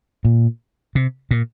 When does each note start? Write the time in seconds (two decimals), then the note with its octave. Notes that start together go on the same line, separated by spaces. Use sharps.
0.25 A#2
0.95 C3
1.31 A#2